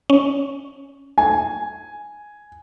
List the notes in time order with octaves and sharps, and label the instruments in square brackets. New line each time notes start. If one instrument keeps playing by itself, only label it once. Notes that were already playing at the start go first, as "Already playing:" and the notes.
[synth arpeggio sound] C#4
[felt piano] G#5